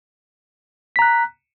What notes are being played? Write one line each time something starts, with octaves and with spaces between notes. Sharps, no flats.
A#5 F#6 B6